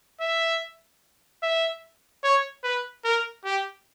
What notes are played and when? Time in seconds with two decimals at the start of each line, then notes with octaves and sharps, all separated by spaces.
0.21 E5
1.43 E5
2.23 C#5
2.64 B4
3.05 A#4
3.45 G4